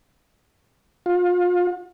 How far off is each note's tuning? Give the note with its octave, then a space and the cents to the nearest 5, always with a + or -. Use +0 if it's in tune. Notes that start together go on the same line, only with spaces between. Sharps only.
F4 +30